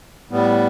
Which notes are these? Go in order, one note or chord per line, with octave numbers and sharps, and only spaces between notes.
A2 G3 B3